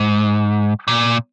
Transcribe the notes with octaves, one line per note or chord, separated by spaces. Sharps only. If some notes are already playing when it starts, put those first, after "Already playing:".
Already playing: G#2
A#2